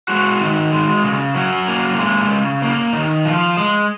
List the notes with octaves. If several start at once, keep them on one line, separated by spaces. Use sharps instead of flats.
G#3 F#4
D#3
G#3
C#3
F#3 C#4
A#3
G#3
C#3
A#3
D#3
F3
G#3